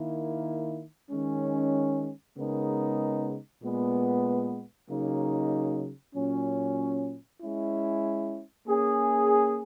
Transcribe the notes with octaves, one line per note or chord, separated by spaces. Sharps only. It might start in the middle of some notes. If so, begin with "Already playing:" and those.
Already playing: D#3 A#3 E4
D#3 G#3 C#4
C#3 G#3 B3 D#4 A#4
A#2 G#3 B3
C#3 F#3 A#3 D#4
A#2 F#3 C#4
G#3 C#4 E4
A#3 C#4 G#4